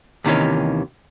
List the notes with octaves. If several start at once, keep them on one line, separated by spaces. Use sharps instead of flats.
D#2 C3 D#3 E3 C#4